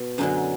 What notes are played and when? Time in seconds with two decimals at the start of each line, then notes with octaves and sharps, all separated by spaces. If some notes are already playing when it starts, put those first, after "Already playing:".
Already playing: B2
0.18 F#2 D3 F#3 D#4